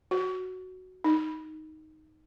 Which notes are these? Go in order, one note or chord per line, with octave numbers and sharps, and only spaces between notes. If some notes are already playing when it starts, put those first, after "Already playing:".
F#4
D#4